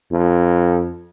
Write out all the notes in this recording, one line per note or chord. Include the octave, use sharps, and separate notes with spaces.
F2